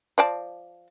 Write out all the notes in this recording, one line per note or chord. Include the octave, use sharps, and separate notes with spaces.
F3 D5 A5